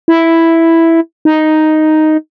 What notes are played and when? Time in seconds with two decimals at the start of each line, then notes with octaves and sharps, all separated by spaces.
0.08 E4
1.25 D#4